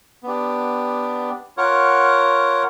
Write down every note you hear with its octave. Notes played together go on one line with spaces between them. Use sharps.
B3 D4 G4
F4 A#4 C#5 F#5